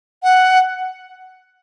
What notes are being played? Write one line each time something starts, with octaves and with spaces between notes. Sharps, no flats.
F#5